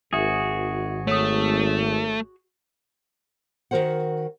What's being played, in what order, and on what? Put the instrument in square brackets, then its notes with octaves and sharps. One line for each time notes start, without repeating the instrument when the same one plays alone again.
[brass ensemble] G#1 [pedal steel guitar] F#4 G#4 [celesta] E5 D#6
[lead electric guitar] A3 [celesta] C#5 D#6
[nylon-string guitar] D#3 F#4 A#4 C5 F#5